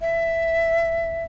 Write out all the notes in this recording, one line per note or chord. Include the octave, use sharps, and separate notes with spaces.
E5